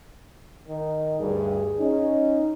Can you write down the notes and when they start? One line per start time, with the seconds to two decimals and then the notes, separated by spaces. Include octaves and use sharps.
0.68 D#3
1.19 D2 G2 G#4
1.79 C#4 D#4